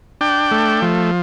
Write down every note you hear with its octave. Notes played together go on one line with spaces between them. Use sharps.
D4 G5
A3
F3